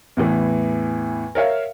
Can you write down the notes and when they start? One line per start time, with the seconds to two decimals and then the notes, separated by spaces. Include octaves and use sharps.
0.17 E2 A2 E3
1.35 A#4 C#5 E5 F5